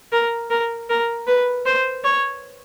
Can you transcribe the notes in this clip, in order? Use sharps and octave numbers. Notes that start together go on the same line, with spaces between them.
A#4
A#4
A#4
B4
C5
C#5